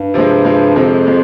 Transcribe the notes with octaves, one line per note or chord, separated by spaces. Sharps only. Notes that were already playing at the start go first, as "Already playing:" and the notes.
Already playing: G2
C3 F3 G#3
C3 F3 G#3
F2 C3 F3 G#3
F3 G#3